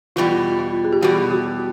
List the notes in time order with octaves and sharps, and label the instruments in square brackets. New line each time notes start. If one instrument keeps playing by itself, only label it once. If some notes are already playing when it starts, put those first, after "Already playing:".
[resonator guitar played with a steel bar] E2 B2 G3 [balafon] F4
[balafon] F4
G#4
G4
[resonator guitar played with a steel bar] E2 B2 G3 [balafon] F#4
[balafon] F#4